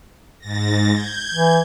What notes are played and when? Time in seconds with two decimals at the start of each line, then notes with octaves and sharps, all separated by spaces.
0.39 G#2 A6 A#6
0.92 G6 G#6
1.34 E3